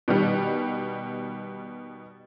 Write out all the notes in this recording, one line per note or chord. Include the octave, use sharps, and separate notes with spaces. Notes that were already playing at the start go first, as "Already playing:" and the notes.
B2 D#3 G3